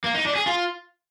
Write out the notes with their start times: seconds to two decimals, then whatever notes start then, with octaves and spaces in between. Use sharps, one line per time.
0.04 A#3
0.14 D#4
0.25 D4
0.35 G#4
0.46 F4